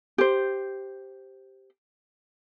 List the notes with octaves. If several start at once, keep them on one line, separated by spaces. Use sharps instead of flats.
G4 C5